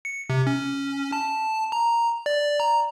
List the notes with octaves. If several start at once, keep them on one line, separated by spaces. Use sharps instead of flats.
C#7
C3
C#4
A5
A#5
D5
A#5